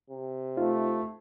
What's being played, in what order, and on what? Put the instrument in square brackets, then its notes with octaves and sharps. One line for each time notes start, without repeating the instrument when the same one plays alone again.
[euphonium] C3
[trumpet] A3 [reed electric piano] D#4 F4 C5